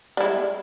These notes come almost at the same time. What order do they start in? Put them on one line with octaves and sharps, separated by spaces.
G3 E4 G#3